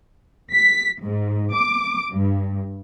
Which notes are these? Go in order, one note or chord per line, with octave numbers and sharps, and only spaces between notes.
B6
G#2
D6
G2